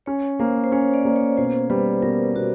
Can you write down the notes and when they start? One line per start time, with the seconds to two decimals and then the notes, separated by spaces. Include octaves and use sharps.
0.06 C#4 C#5
0.39 A#3 C5
0.64 C5
0.72 C#4 C#5
0.94 D5
1.05 A#3
1.16 C#5
1.37 B2 C5
1.70 G3 B4
2.02 B2 A#4
2.36 B2 F#4